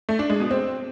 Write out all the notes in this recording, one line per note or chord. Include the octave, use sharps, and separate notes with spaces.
A3
D4
G#3
B2
C4